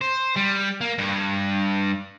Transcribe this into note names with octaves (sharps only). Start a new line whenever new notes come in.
C5
G3
A#3
G2